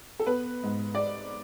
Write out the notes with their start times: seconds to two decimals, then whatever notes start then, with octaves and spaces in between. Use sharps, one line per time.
0.20 A4
0.27 B3 B4
0.63 G#2
0.95 D5